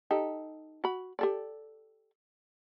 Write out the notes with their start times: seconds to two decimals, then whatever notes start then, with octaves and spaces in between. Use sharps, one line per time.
0.11 D#4 G4 A4
0.84 F#4 B5
1.19 G4 A4 D5